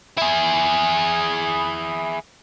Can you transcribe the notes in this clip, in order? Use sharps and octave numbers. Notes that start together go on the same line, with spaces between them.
E4 G#4